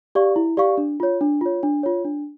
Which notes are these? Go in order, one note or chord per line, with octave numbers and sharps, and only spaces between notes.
G4 D5 F5 C#6
E4
G4 D5 F5 C#6
D4
F4 C#5
D4
F4 C#5
D4
F4 C#5
D4